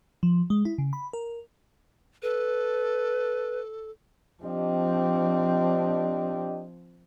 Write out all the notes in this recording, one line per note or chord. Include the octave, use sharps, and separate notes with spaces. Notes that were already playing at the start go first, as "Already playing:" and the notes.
F3
G#3
E4
C#3
B5
A#4
A4 B4
F3 C4 D4 G4 D#5